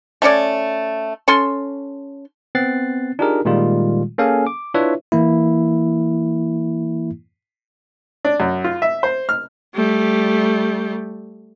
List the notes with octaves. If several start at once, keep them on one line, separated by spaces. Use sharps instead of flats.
A3 C#4 C#5 D5
C#4 A4 C6
B3 C4 F#6 A6 C7
D4 D#4 F4 G4 G#4 A#4
A#2 D#3 G3 G#3 F4
A#3 C#4 G#4 A4 F5 G#5
D6
D4 E4 F4 B4 C#5 E5
E3 A#3 E4
D4
F#2
F4
E5
C5
F6
G3 A3